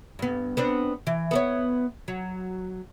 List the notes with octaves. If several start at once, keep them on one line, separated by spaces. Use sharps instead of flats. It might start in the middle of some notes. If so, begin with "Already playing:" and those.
G2 B3
B3 C4 D4
E3
B3 A4 C#5
F#3